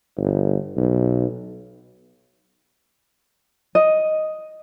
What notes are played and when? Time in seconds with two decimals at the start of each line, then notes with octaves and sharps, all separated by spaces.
0.17 G1
0.76 B1
3.75 D#5